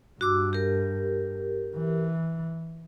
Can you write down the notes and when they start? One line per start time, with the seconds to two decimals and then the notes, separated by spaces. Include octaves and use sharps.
0.21 G2 F#4 D6 E6
0.53 G4 A#4
1.76 E3